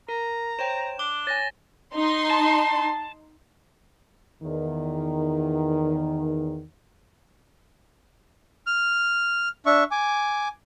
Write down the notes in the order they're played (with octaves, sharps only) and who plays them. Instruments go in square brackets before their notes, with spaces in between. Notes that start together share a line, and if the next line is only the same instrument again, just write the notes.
[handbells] A#4 [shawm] A#5
[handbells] C5 C#5 G5 [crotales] E7
[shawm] D4 [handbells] D6 [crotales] G7
[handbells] C#5 G#5 [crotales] A6 A#6
[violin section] D#4 C6
[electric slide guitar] A5
[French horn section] E2 D#3
[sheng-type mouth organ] F6
D4 E5 C#6
G#5 D6